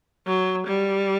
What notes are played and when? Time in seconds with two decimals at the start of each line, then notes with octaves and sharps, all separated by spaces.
0.27 F#3
0.66 G3